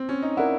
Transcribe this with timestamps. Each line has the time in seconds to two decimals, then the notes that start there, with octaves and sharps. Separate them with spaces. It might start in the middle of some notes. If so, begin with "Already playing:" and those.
Already playing: C4
0.09 C#4
0.22 D#4
0.37 E4 A#4 D5 F#5